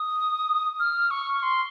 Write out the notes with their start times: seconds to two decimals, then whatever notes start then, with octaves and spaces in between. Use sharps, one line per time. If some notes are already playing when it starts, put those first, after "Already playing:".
Already playing: D#6
0.79 F6
1.11 C#6
1.42 C6